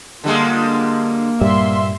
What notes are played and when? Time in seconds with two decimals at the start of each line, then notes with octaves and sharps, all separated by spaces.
0.24 D3 G3 G#3 A#3 F4
1.41 G2 A#2 G3 E5 C6